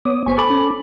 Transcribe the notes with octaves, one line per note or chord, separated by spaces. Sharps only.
B3 C#5 D6 D#6
G1 B3 C5 G#5 C#6
A4 B5 D6
C#4